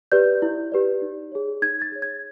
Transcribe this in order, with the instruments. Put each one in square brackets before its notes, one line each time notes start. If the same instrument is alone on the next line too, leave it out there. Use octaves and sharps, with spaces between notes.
[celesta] G4 B4 D5 G6
E4
G4 B4 D5
D#4
G#4 C#5
D#4 G#6
A6
G#4 C#5
G#6